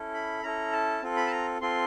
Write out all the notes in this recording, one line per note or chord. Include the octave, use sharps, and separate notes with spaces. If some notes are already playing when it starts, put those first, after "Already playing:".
Already playing: C#4 E4 A4
B5
C#4 E4 A4 A#5
A5
C4 F4 A4
B5
A5
A#5
C4 F4 A4 C6